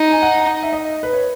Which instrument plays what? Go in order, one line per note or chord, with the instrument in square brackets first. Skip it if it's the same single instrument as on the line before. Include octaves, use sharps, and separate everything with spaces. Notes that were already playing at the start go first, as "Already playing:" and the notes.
Already playing: [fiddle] D#4
[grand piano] G#5
F#5
A#5
E5
D#5
B4
C#5